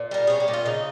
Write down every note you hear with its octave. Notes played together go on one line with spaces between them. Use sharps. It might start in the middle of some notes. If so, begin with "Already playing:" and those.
Already playing: A#2
G3 A#4
C#4 G#4
G4
A#2
F4
C#3 D#4